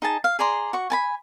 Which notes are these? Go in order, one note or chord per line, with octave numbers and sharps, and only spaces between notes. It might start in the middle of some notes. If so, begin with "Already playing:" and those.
D#4 G#4 A5
F5
G#4 D5 A#5 C6
F#4 C#6
G#5 A5 B5